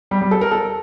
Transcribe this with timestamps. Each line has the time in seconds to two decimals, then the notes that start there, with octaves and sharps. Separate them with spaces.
0.11 G3
0.21 G3
0.31 A4
0.41 A#4
0.51 A4